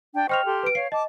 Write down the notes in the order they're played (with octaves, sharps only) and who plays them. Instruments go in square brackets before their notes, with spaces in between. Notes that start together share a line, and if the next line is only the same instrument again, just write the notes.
[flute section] D4 G5
[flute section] C5 D#5 C#6 [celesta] G5 F6 F7
[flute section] G4 A4 C6
[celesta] B4 D7
[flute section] C#5 F5 [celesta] C7
[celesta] D#5 [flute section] A5 D6